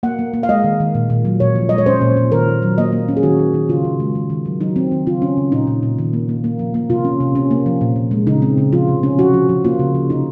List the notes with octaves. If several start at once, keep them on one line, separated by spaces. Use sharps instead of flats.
A#3 F#5
A#3
A#3
F5
G#3 D#5
D#3
D#3
A#2
A#2
F#3
A#2 C#5
F3
G#3 D#5
C#5
C#4 C5
A#2
A#2
D#3 A#4
D#3
F#3
A#3 D#5
A#3
C#4
G#4
D#3 F#4
D#3
D#3
C#3 F4
C#3
G#3
D#3
D#3
F#3
F#3 D#4
C4
D#3
C#3 F4
C#4
C#3
A#2 D#4
A#2
A#2
D#3
A#3
A#3
A#3
F3
A#3
C3 F4
C#4
C3
C#4
A#3
F3
A#2
A#2
G#3
C#3 D#4
C4
C#3
F3 F4
C3
C#4
F3 F#4
F3
F3
A#3 F4
C#3
F3
C3 D#4